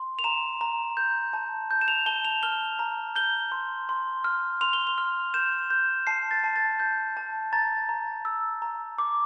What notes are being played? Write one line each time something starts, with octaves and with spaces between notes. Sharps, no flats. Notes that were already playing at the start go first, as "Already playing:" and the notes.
Already playing: C6
F7
A#5 E7
A#5
G6
A5
G6
E7
F7
A5 G7
F7
F6 G7
A#5
G6 G7
C6
C6
F6
C6 F7
G7
F7
F6
G6 E7
G6
A5 C7
A6
A5
A6
G6
A5
A#5 A6
A#5
E6
A#5
D6